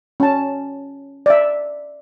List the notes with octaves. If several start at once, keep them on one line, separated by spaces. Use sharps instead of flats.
C#4 A5
D5 E5